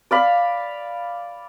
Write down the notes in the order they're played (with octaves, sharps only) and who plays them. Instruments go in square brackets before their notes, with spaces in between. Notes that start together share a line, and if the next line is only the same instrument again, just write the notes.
[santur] D5 F5 B5